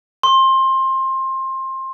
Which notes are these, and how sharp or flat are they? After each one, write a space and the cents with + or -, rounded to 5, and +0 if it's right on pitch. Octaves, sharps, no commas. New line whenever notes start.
C6 +20